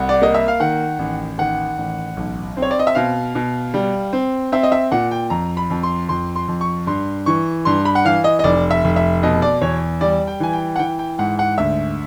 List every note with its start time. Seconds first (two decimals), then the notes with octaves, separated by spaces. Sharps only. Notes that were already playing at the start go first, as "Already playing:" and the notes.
Already playing: C2 F#5
0.09 D5
0.21 A#3 D#5
0.34 E5
0.48 F5
0.60 D#3 F#5
0.99 A1
1.38 D#3 F#5
1.78 A1
2.17 B1
2.57 C4
2.62 C#5
2.71 D5
2.79 D#5
2.87 E5
2.95 B2 F5
3.35 B2
3.74 G3
4.13 C4
4.52 C4 E5
4.63 D#5
4.72 E5
4.92 A#2 F#5
5.11 G5
5.30 F2 A#5
5.57 B5
5.70 F2
5.83 C6
6.09 F2 C6
6.36 C6
6.48 F2
6.61 C#6
6.87 G2 C6
7.26 E3 C#6
7.65 G2 C6
7.85 B5
7.95 F#5
8.05 E3 F5
8.24 D#5
8.39 D#5
8.44 F1 D5
8.71 E5
8.84 F1
8.96 E5
9.23 B2 D#5
9.42 D5
9.61 E2 C#5
10.01 G3 D5
10.27 G5
10.40 E3 G#5
10.53 G5
10.76 F#5
10.79 E3 G5
10.99 G5
11.19 G#2 F#5
11.39 F#5
11.58 D2 E5